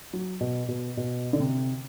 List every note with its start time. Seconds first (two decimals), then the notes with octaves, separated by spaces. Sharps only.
0.13 F#3
0.41 B2
0.68 B2
0.97 B2
1.33 D3
1.40 C3